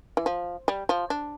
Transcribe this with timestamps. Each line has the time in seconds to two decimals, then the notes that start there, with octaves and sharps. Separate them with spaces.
0.17 E3
0.26 F3
0.68 G3
0.89 F3
1.10 D4